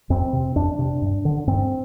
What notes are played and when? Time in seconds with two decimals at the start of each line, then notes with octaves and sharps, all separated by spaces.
0.10 F2 C4
0.33 C3
0.56 F2 D4
0.79 C3
1.02 G2
1.25 D3
1.47 G2 C4